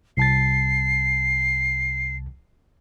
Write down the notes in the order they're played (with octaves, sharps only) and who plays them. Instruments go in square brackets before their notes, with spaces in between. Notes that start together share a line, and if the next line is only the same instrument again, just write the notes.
[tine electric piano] C2 A5 A6 [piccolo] C7